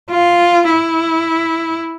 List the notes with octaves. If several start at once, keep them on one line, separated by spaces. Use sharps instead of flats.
F4
E4